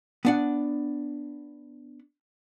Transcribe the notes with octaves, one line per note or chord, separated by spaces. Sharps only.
B3 D4 F#5